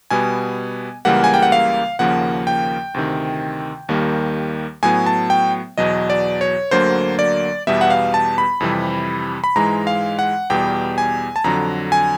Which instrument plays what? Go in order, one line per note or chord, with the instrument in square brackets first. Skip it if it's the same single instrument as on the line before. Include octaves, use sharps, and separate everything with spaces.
[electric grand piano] B2 G3 B3 G#5
C#2 C#3 E3 G3 A#3 F#5
G#5
G5
F#5
F5
D#2 C#3 F3 A#3 F#5
G5
D2 C3 D#3
D#2 D#3 G3 A#3
A2 F#3 B3 G#5
A5
G5
E2 B2 F#3 D#5
D5
C#5
D2 D3 F#3 A#3 C5
D5
E2 B2 G3 B3 E5
F#5
F5
A5
B5
F2 C3 E3 G3
B5
G#2 E3 G#3 A#5
F5
F#5
E2 B2 G3 B3 G5
G#5
A5
F2 D3 F#3 A#5
G#5